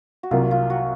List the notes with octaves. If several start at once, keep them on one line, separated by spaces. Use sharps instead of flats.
F#4
C2 C3 F#3 A#3 F4
F4
F#4